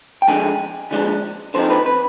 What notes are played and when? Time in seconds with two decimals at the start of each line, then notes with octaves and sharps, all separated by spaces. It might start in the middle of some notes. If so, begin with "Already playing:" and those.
0.22 G5
0.28 D3 F3 G#3 D4 G#5
0.91 D3 F3 G#3 D4
1.54 D3 F3 C4 D#4 C5
1.70 B4
1.86 B4